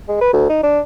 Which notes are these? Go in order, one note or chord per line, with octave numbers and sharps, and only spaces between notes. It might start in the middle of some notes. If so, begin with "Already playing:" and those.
G#3
B4
D2
D#4
D4